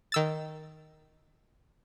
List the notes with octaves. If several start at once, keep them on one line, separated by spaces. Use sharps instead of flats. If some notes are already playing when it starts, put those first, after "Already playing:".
D#3 E6 A6